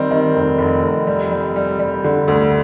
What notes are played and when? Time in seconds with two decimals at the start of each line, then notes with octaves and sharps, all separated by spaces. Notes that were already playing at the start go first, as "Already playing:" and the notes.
Already playing: D#3 G3 C4
0.11 D#3
0.34 F1
0.58 F1
0.83 F1
1.07 G3
1.31 G3
1.56 G3
1.79 G3
2.04 D3
2.28 D2